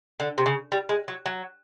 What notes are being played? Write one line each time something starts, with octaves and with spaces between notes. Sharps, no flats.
D3
C3
C#3
G3
G#3
F#3
F#3